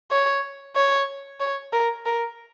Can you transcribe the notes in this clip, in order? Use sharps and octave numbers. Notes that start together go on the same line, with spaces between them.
C#5
C#5
C#5
A#4
A#4